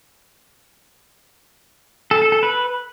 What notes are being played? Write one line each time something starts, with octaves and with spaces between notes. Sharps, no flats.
A4
A4
A4
B4